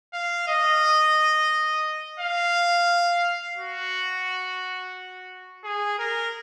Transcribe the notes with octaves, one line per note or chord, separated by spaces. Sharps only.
F5
D#5
F5
F#4
G#4
A#4